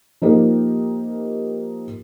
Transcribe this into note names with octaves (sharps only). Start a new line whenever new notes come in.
F3 A#3 D#4 G4 A#4